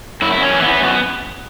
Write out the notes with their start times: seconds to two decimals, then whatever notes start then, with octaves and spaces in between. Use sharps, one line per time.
0.22 F#2 E4
0.32 E4
0.37 F#2 C#4
0.52 E3
0.62 B3
0.67 E3
0.82 F#2 B3